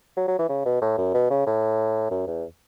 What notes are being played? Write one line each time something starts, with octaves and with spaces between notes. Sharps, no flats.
F#3
F#3
E3
C#3
B2
A2
F#2
B2
C#3
A2
F#2
E2